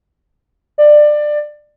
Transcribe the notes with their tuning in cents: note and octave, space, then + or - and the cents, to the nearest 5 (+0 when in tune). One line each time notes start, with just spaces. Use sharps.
D5 +20